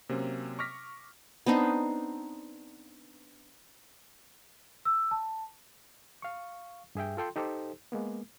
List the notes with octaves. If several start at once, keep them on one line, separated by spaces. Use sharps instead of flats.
C3 F#3 A#3 C4 C#4
C#6 D6 F6 A#6 B6
B3 C4 D4 D#4
E6
A5
F5 C#6
G2 G#4 E5 G5
F4 A4 G5 C6
D#4 G4 A4 C5
G#3 A#3 B3